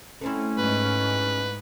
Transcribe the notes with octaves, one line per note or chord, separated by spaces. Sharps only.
A3 C4 C#4 E4
G#2 B4